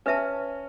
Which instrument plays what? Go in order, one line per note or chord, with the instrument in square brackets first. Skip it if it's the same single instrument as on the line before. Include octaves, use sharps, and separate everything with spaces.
[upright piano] C#4 [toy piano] B4 E5 A5